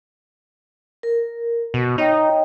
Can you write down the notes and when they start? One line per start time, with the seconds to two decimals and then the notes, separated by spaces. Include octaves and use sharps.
1.03 A#4
1.74 B2
1.98 D#4 C#5 D#5 G5